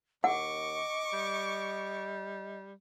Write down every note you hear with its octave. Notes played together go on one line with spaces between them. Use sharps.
D#2 D#5 F#5 C#6 D6
G3